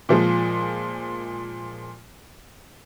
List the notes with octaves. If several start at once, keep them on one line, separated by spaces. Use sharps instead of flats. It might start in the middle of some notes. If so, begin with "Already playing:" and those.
A#2 F3 G#3